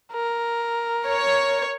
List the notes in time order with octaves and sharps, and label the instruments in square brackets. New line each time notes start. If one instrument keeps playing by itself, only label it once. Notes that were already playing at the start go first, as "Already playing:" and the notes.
[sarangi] A#4
[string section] C#5